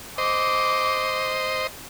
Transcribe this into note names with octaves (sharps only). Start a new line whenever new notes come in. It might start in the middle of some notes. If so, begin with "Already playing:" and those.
C5 D#5 D6